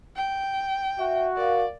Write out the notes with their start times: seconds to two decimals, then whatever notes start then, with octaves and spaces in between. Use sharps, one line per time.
0.16 G5
0.99 F#4 E5
1.37 A#4 D5 F5